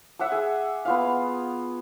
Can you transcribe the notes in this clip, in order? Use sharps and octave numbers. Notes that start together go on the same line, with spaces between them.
E5 F#5 D6 E6
G#4
B3 F4 F5